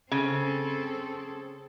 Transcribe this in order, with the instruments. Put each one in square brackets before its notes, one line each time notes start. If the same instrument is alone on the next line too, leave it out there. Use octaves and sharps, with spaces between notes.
[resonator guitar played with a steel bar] C#3 [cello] C4 A4